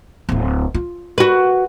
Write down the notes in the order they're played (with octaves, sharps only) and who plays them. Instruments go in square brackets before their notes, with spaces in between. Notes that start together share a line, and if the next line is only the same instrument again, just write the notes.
[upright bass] D1 E4
F4
[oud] F#4 B4